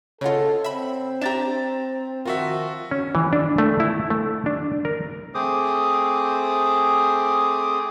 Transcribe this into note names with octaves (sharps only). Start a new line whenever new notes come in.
C#3 F4 A4 C#5 D#5 F#5
C4 E5 B5
D4 G4 E5 A#5 A6 E7
D#3 F3 F4 F#4 A#4 E5
C#4
E3
D4
A3
E4
A3
D4
A#4
A3 C4 G#4 C5 D6 D#6